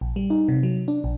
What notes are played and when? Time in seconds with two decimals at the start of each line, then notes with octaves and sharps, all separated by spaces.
0.01 A#1
0.16 G3
0.30 D#4
0.48 C3
0.63 F#3
0.88 D4
1.04 A#1